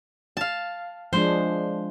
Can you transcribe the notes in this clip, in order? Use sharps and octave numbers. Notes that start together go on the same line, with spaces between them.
F5 A5
F3 G#3 D4 C5